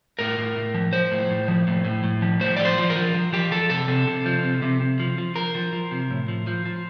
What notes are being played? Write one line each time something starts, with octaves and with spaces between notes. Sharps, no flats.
A2 A#4
A2
A2
F3
F3 C5
A2
A2
F3
A2
A2
A2
F3
A2 C5
F3 D5
C5
F3
A#4
F3
F3
F3 G4
F3 A4
C3 A4
C3
C3
F3
C3
C3
C3
F3
F3
F3 A#4
F3
F3
C3
A2
F3
F3
F3